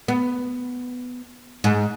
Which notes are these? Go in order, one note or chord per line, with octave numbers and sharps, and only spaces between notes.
B3
G#2